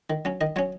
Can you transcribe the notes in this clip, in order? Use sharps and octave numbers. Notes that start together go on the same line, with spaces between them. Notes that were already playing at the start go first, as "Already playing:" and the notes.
D#3
F#3 C#4
D#3 D#5
F#3 C#4 C#5